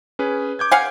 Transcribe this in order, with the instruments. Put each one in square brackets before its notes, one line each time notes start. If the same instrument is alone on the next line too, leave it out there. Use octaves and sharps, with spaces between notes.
[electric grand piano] C#4 G#4 B4
D6 G6 G#6
[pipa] F5 F#5 G#5